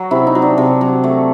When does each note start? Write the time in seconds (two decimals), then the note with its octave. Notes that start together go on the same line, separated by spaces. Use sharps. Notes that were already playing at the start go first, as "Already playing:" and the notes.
Already playing: F#3 F#4
0.11 C3 E4
0.27 D#4
0.35 F#3
0.42 D4
0.58 C3
0.81 F#3
1.04 A3